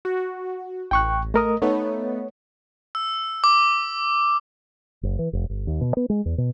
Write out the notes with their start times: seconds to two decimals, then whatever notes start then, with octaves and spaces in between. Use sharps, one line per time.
0.05 F#4
0.91 A1 G5 C#6 F#6
1.34 A3 A#4 D#5 D#6
1.62 A3 B3 D#4 C#5
2.95 E6
3.44 D6
5.03 F#1
5.19 E3
5.33 F1
5.50 G1
5.67 D#2
5.81 B2
5.97 B3
6.10 G#3
6.26 E2
6.38 B2